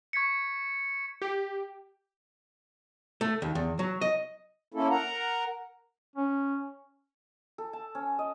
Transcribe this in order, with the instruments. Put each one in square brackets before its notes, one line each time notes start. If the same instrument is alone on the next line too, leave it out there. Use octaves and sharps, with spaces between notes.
[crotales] C#6 G#6 B6 C#7
[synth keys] G4
[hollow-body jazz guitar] A3
D#2
E2
F#3
D#5
[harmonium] A#3 C#4 E4 A4
A#4 F#5 A#5
[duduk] C#4
[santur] A4
A5
C#4
D#5